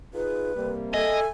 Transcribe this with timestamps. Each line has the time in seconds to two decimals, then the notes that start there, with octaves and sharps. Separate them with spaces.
0.14 D#4 F4 G#4 B4
0.56 C3 G3 A#3
0.94 A4 D#5 E5 G#5